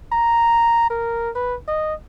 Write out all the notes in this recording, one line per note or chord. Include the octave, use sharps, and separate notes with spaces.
A#5
A#4
B4
D#5